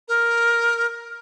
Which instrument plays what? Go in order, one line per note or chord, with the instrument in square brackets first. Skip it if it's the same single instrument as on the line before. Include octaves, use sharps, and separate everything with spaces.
[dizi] A#4